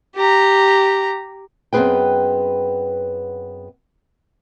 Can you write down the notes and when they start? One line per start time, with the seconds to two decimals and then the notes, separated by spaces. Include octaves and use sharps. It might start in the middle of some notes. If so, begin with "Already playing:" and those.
0.15 G4 A#5
1.73 F#2 B3 C4 G#4 B4 G5